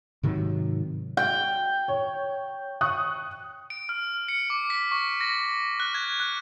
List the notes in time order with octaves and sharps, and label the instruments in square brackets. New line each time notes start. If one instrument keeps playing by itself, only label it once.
[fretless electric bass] G#2 C3 D#3 F#3
[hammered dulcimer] G5
[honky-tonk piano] C#5
C#6 D#6 F#6
[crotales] D7
F6
C#7
D6
B6
C#6
A#6
F#6
G#6
F#6